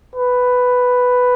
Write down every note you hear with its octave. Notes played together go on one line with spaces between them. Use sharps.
B4